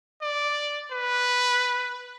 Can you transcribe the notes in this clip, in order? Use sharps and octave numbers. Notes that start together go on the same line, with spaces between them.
D5
B4